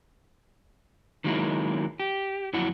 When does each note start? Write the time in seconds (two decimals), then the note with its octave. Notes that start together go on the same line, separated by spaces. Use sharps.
1.24 D#3 F#3 G#3 A#3 D4 E4
2.00 G4
2.53 F2 F#3 E4 F#5